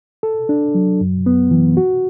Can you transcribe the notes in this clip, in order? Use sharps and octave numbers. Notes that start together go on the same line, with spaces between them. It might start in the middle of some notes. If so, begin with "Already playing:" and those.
A4
D4
F#3
F#2
B3
E3
F#4